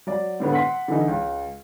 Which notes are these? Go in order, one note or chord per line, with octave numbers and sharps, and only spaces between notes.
F#3 D5
A2 D3 B3
F#5 C6 B6
D3 E3 D#4
C#2